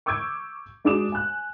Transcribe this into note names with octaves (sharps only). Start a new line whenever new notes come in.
C#6 D6 E6 G6 G#6 D7
G#3 D4 F#4 D6 D#6 E7
G#5 F#6